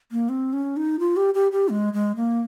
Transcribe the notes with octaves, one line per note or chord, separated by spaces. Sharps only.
A#3
C4
C#4
D#4
F4
G4
G4
G4
G#3
G#3
A#3